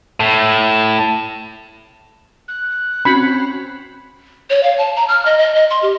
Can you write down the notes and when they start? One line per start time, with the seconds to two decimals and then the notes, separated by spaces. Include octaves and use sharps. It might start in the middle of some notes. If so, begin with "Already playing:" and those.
0.20 A2
2.48 F#6
3.05 C4 C#4 F#4 B5
4.50 C#5
4.63 F5
4.78 A5
4.96 A#5
5.08 F6
5.26 D#5
5.38 D#5
5.55 D#5
5.70 C6
5.82 G4